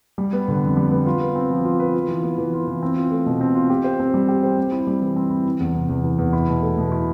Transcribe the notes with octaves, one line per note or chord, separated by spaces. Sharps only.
G3
B3
D3
F2
G3
B3
F4
B4
C4
F3
F4
B4
F4
E3
B3
E3
F4
E3
C4
F4
A3
B2
C4
F4
G4
C5
C4
G3
G4
C5
C4
E4
G3
E3
C4
E4
E3
E2
C3
E2
E3
E2
E4
B2
A3
B2
E4